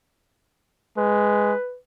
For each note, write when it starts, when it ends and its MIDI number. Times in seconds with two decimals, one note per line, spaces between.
0.97 1.53 56
0.97 1.76 71